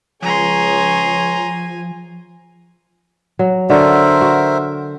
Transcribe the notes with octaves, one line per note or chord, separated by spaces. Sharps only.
C#2 F3 G#4 C#5 G#5 A#5 C6
F#3
D3 F#4 A4 A#4 C5 E5
F#4